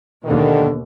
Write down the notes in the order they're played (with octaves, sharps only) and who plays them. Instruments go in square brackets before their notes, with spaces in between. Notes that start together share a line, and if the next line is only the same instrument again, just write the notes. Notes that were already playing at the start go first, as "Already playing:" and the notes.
[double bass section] D#2 B2 [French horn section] D3 D#3